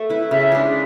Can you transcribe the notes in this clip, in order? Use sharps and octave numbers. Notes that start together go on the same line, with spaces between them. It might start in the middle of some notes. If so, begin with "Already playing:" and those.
Already playing: A3
E4 B4
C#3 E5
G#3 D4